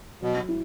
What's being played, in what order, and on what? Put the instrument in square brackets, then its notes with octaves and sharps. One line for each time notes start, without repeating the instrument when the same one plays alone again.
[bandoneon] B2 [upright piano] F#3
[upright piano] E4